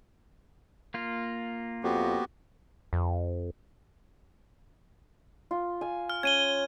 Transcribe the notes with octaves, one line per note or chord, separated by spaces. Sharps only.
A#3 F4
F2 B3 F#4 G4
F2
F4
F5 G#5
F6
C#4 G#6 D#7 G7